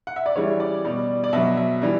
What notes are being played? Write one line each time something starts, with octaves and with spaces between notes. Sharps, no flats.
F#5
E5
D5
C#3 E3 G3 C#5
D5
B2 G3
D5
B2 F#3 E5
E5
E3 G3